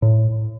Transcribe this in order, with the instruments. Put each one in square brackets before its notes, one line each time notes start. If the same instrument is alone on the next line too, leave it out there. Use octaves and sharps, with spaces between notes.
[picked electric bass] A2